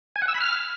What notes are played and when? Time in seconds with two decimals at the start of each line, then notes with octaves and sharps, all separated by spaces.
0.16 G#5
0.22 F#5
0.28 E6
0.34 B5
0.41 F6